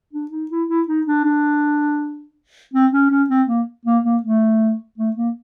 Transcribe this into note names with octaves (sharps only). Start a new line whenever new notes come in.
D4
D#4
E4
E4
D#4
D4
D4
C4
C#4
C#4
C4
A#3
A#3
A#3
A3
A3
A#3